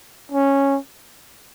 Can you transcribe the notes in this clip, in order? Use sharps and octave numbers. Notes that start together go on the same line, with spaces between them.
C#4